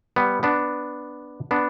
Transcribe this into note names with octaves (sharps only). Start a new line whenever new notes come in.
G3 B3
B3 D4
B3 D4